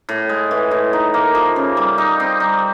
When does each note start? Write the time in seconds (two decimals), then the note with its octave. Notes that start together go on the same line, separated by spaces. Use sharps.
0.09 A2
0.29 G#3
0.51 E3
0.71 A2
0.93 D#4
1.14 A#3
1.35 F3
1.56 C#3
1.77 G3
1.98 D#4
2.20 C4
2.40 G3